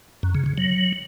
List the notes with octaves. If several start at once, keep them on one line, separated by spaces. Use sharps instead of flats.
F#2
C#3
C#3
F#3